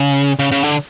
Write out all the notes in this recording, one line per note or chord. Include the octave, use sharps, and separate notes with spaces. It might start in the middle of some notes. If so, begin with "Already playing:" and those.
Already playing: C#3
C#3
C#3
D3